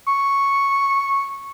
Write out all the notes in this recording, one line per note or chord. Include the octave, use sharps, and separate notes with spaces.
C#6